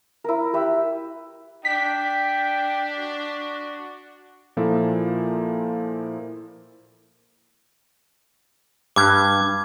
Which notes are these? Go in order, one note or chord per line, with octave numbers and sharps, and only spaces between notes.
E4 A#4
G4 B4 E5
D4 G5 B6
F#4
A#2 F3 A#3 E4 A4
G2 D6 G#6